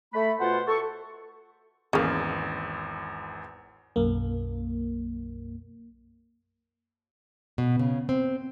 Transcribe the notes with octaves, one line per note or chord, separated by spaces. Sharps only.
A3 B5
B2 F4 C5 F#5
A4 C#6
G#1 E2 C#3 A#3
B1 F#2 A#3
B2
C#3
C4